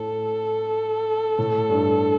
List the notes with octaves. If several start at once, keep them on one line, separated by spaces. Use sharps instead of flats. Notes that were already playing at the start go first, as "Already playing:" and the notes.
Already playing: A2 A4
A2
G2